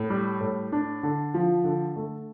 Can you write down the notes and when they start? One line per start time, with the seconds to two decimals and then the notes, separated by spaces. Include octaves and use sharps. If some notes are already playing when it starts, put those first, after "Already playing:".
Already playing: A2
0.10 G3
0.41 A2
0.72 D4
1.03 D3
1.34 F3
1.64 D3
1.96 A3